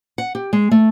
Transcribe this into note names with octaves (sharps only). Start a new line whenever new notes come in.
F#5
G4
G#3
A3